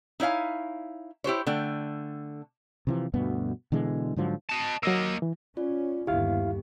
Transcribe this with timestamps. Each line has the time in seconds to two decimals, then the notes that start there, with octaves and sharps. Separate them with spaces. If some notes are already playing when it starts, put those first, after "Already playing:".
0.20 D#4 E4 C#5 F5 G#5
1.24 E4 G4 C5 C#5
1.47 D3 A3 G5
2.87 C3 E3 F3
3.14 D2 G2 B2 B3
3.72 B2 D3 E3 G#3
4.16 G#2 D3 F3 F#3
4.50 D#5 A5
4.83 F#3 A#3 D#5 E6
5.22 E3
5.57 C#4 F4 D5
6.07 G1 D#2 B3 E4 G4 F5